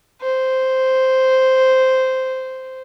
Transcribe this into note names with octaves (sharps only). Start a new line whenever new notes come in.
C5